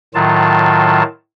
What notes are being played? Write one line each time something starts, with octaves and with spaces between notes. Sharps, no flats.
A2 D#3 F#3 F4 A5